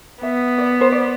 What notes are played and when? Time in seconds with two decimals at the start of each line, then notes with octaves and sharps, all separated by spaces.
0.22 B3 E5
0.58 D5
0.81 C5
0.92 D5